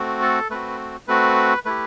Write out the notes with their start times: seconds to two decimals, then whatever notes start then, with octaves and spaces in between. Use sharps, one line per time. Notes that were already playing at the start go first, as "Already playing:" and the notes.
Already playing: A3 C4 F#4
0.22 A4
0.50 A3 C4 F#4 B4
1.08 A3 C4 F#4 B4
1.65 A3 E4 G4 B4